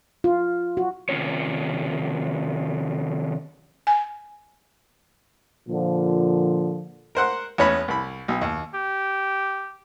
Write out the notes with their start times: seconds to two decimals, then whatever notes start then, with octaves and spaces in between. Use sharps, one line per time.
0.24 F4
0.77 F#4
1.09 C3 D#3 C#4 F4 C#5
3.87 G#5
5.69 A#2 D3 F3
7.15 A#4 C5 F#5 C6
7.58 E2 B3 C#4 C#5 A5 B5
7.88 C2 B5
8.28 B1
8.41 D#2
8.74 G4